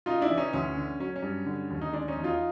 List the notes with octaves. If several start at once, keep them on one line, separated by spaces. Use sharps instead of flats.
C#3 D#4 F4
D4 E4
E3
C#4 D#4
D2 C#4
D3
F#3 C#4
C#4
G2
D3
D#2
D#4
G#3 D4
C#4 D#4
E2
D#4 F4